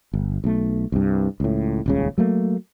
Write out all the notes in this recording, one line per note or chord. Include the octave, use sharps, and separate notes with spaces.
G1
B1 A3
C2 G2
C#2 A2
D#1 C#2 C#3
F#3 A3 A#3